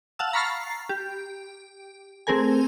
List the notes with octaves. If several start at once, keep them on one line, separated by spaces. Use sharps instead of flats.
F5 F#5 A5 E6
A#5 B5 C#6 F6 A6 C7
G4
A3 C4 G#4 A#4 G#5